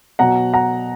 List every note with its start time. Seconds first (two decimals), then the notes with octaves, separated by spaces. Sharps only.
0.19 B2 F#3 F#5 A#5
0.53 F#5 A#5